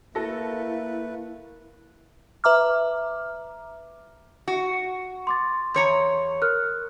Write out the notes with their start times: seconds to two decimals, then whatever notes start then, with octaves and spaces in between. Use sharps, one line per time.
0.15 A3 A#3 E4 A4 B4 A#6
2.44 B4 E5 A#5 D6 F6
4.48 F#4
5.27 C6 D6 A6
5.74 E2 C#5 A#5 C6
6.42 A#4 F6 F#6